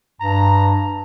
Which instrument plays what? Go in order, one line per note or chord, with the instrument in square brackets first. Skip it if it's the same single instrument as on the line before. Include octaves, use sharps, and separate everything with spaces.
[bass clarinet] G2 [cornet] A#5